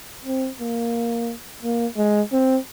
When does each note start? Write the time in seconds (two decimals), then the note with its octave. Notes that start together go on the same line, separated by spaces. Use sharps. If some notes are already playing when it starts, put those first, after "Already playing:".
0.25 C4
0.60 A#3
1.62 A#3
1.97 G#3
2.32 C4